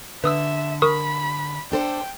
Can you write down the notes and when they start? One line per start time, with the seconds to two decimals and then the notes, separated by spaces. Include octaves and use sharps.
0.24 D3 B4 E5 D#6 E6
0.82 A#4 B5 C#6 D#6
1.72 D4 A4 C5 G5